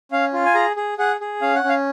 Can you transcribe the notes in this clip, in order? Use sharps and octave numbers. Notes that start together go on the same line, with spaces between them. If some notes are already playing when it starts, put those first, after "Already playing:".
C#4 F5
F4
G#5
G#4 A#5
G#4
G#4 F#5
G#4
C#4 F5
F#5
C#4
F5